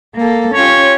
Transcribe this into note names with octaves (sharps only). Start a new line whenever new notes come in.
A#3 A4
C#4 F4 G4 C#5